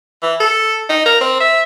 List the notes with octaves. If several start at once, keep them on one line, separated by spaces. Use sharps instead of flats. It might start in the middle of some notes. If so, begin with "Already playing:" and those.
E3
A4
D#4
A#4
C4
E5